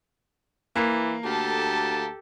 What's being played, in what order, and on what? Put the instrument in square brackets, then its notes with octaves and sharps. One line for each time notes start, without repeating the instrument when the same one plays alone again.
[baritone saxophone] E3 [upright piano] A#3
[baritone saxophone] D2 [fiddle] G4 A4 [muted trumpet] A5